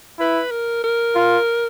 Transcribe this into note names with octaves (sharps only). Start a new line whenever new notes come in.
E4 B4
A#4
A#4
F4